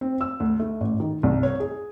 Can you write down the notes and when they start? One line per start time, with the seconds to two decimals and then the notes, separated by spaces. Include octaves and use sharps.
0.01 C4
0.21 E6
0.40 D2
0.60 A3
0.80 A1
1.00 D#3
1.23 C2
1.43 C#5
1.60 G#4